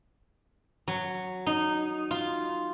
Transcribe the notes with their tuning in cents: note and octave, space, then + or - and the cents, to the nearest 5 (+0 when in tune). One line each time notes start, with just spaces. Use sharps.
F#3 -5
D#4 -15
F4 -5